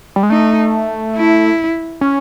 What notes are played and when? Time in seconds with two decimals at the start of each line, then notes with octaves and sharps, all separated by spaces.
0.16 G3
0.23 G#3
0.30 A3 D#4
1.16 E4
2.01 C#4